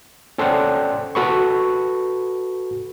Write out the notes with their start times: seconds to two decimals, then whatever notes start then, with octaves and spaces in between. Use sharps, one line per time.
0.38 C#4 A4 C5 D5 F#5 G5
1.15 F#4 A4 B4 B5 C#6